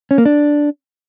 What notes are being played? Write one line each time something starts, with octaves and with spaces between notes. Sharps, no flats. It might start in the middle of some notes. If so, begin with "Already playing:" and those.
C#4
A#3
D4